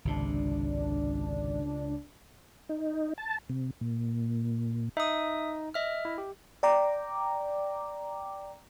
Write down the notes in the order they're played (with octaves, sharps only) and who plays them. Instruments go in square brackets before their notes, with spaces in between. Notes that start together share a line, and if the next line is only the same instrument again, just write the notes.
[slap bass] G#1 C3 [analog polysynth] C#2 D4
[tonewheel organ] D#4
A5
C3
A#2
[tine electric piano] D#4 [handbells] E5 D#6
[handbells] D#5 E5 F6
[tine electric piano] E4
G4
[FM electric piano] D5 G5 A#5 D6